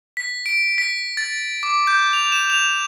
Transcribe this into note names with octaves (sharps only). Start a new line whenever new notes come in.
B6
D7
B6
A6
D6
G6
F7
E7
F7